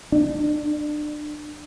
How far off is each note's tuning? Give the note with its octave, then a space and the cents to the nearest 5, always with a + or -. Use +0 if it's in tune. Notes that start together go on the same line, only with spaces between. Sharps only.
D4 +30